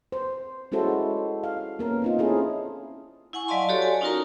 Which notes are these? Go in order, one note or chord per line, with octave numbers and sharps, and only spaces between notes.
C5
G#3 C#4 E4 F#4 A4 C5
F5
A#3 B3 C#4 A#4
C4 D#4 F4
C4 C#4 E4 G#4 A4
E4 F#5 G#5 C#6
F#3 D5 D#5 F5 A5 C6
F#4 G4 A4 C#5 D5
G#5
C#4 D#4 F4 F#4 A#4 A#5